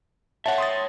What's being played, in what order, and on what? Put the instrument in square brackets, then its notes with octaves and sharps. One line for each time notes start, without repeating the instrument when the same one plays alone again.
[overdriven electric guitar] C#5 E5 [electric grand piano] F#5 A5
[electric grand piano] C6 D#6 A6